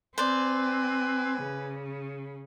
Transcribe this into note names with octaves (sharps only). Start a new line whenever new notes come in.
C4 B4 C5 D5 G#5
C#3